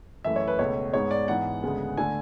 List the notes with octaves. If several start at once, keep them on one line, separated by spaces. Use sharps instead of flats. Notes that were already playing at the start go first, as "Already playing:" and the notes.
F#2 E3 A3 E5
C#5
B4
C#2 B2 A3 C#5
G#2 G#3 B3 C#5
D5
G#2 E3 B3 F#5
D2 C#3 G#3 B3
D3 A3 G#5